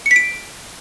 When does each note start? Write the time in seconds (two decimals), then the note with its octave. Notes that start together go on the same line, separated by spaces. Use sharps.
0.06 C#7
0.11 B6
0.16 D7